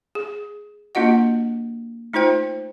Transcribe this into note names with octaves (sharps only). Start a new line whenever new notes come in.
G#4
A#3 D4 F4 F#4 D#5 F#5
A3 D#4 F4 C5 G5